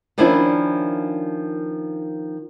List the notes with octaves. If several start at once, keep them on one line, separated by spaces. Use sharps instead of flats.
D#3 F3 C#4 D4 E4